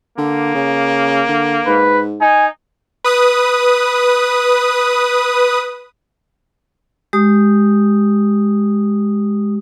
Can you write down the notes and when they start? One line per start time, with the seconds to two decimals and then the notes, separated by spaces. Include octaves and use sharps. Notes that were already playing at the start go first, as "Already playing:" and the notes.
0.18 D3 A#3
0.55 C#3
1.28 D3
1.67 G#2 B4
2.21 D#4 G#5
3.04 B4 D#6
7.13 G#3 G4 D#6